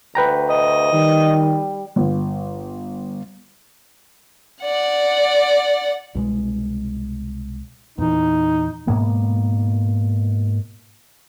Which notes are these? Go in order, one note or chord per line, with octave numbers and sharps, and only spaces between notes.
D2 B4 G5 A#5
D#5
D#3 G3
G1
D5 F#5
C2 B2 G#3
E2 A#2 E3 D#4
G#2 B2 A#3 B3